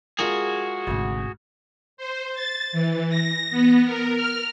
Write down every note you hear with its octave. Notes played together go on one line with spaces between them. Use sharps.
G#3 F4 F#4 G#4 A#4
G#1 D2 C3
C5
A6
E3
A#6
B3
A#4
F6